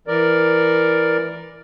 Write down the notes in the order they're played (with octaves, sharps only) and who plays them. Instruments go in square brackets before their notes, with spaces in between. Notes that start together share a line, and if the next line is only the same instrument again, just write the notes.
[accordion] E3 A#4 D5